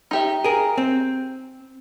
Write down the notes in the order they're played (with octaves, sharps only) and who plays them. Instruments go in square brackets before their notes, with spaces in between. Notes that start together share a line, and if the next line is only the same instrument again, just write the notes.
[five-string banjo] D#4 G4 E5
[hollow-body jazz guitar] G#4 A#4
C4